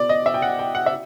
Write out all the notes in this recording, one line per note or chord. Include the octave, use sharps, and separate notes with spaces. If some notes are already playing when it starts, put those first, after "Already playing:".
Already playing: B2 D5
D#5
E5
G5
F#5
G5
F#5
E5